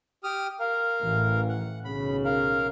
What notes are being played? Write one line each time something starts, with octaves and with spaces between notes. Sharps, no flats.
G4 D#6 F6
A#4 F5
A1 E3
F#5
B1 C#3 B5
A#4 F5